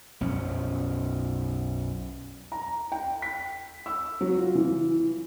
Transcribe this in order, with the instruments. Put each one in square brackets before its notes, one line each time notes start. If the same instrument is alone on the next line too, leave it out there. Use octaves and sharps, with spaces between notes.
[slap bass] B1 F#2 F3 C#4
[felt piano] A#5
G5
B6
E6
F#3
F4
E3